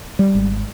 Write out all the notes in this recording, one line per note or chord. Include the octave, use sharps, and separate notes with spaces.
G3
G#1